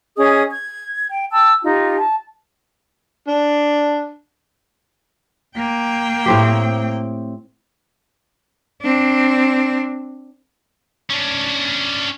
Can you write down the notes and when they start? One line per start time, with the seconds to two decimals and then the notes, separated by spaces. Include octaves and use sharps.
0.17 C#4 G#4 D#5 D#6
0.50 G#6
1.10 G5
1.31 G5 A5 E6
1.63 D#4 F4 G4
1.96 A5
3.28 D4
5.56 A#3 G5
6.26 A2 C4 G4
8.82 C4 D4
11.10 C#4 D4